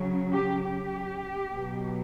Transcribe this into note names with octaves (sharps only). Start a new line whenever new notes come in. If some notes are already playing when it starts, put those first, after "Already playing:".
Already playing: C#3 F#3
G4
G4
B2 F#3